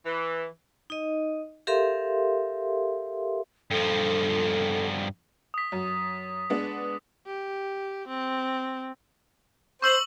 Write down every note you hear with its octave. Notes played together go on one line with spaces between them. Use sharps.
E3
D#4 D#5
G4 A4 A#4 E5 F5 C6
G2 F3 A4
D#6 B6
F#2
G#3 B3 D4
G4
C4
C5 C#6 E6 F#7